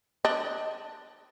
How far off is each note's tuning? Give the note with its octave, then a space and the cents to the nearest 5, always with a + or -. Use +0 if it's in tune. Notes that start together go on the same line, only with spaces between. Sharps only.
D4 +10 D#5 +10